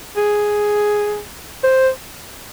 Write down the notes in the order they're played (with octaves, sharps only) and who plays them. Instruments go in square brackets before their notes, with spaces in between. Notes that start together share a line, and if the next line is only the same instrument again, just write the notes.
[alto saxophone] G#4
C5